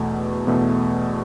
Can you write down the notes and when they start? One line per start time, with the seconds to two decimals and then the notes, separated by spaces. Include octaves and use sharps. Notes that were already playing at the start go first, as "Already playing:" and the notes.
Already playing: E2 B2 A3
0.47 E2 B2 A3